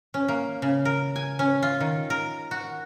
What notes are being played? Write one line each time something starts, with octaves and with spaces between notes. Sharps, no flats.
C#4
A#3
C#3
A#4
G#5
C#4
F4
D#3
A#4
F#4